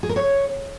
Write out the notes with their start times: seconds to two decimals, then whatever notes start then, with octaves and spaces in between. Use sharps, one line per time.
0.03 G#4
0.09 A#4
0.16 C#5